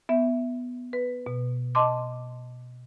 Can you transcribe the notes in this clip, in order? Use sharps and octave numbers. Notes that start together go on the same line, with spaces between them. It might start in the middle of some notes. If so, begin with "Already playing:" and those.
B3 E5
B4
B2
D#5 A5 C6 D6